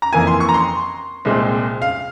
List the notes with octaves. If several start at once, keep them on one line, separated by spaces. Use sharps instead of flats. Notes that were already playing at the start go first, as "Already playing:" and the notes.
A#5
F2 E3 A#3 E4 G#5
C6
C#6
A#5
C6
C2 A#2 G#3 C4
F5